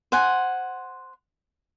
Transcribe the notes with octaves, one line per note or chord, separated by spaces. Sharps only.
C5 F#5 G#5